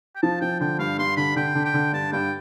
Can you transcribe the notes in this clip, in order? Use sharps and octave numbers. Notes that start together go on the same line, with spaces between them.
G5
F3 A5
F3 G5
D3 G5
G2 F5
G2 C6
D3 B5
D3 G5
D3
G5
D3
G2 A5
G2 G5